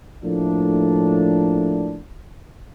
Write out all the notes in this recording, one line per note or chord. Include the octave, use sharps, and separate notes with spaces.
A2 F3 A3 A#3 D4